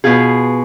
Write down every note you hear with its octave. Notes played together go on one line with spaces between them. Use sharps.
B2 B3 F4 G#4